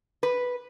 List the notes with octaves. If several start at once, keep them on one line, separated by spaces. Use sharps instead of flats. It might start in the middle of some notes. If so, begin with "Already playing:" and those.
B4